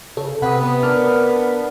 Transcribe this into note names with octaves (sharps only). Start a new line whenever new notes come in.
C#3 A4
C3 B4 F#5 D#6
B3
D4 A#4 F6